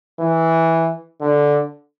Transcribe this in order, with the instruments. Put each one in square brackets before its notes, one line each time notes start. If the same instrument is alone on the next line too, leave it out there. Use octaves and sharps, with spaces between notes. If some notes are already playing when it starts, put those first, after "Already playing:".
[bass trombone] E3
D3